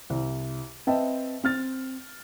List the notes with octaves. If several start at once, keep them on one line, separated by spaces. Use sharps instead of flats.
C2
C4 B4 D#5 E5 G5 A5
C4 F6 A6